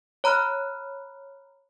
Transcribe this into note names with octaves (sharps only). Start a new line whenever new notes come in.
C#5 A#5 B5 F6 F#6